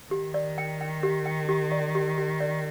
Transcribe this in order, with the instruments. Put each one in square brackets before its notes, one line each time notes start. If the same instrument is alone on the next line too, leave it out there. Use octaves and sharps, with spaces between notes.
[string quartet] D#3 [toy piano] G4
[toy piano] D5
G5
G5
G4
G5
G4
D5
G4
G4
D5